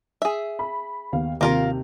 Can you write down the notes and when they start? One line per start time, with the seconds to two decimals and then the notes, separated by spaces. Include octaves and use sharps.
0.22 G#4 E5
0.59 B5
1.12 D#2 B3 F5
1.41 D#2 C3 A#3 F4 A#4